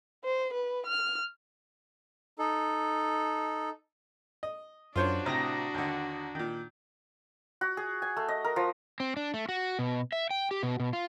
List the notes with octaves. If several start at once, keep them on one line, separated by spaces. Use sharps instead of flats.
C5
B4
F6
D#4 A4
D#5
F#2 D4 F4 F#4 C5 C#5
A2 C3 A#5 D#6 A#6
D#2 D3
A#2 D#3
F#4
G#4
G#5
A3
D#5
A#4
F3
C4
D4
A3
F#4
B2
E5
G5
G4
B2
B2
F4